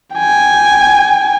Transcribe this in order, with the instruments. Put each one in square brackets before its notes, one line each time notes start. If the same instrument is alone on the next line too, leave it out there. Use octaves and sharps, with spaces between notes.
[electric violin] G5 G#5